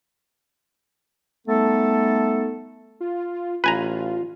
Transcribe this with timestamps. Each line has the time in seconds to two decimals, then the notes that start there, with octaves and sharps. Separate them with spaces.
1.47 G3 A3 B3 D#4 A4
3.01 F4
3.64 A1 F4 B4 G#5 A#5